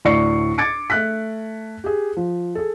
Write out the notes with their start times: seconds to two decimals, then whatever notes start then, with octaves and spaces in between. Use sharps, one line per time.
0.05 D2 A2 D5 C#6 C7 C#7
0.58 D6 G#6 A6 C#7 D7
0.90 A3 F#6 B6
1.84 G4 G#4
2.17 F3
2.55 G#4 A4